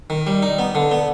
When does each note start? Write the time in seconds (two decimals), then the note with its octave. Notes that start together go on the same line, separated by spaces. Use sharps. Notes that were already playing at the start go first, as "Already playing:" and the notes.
0.10 D#3
0.27 G3
0.42 D#4
0.59 B3
0.75 D3
0.91 B3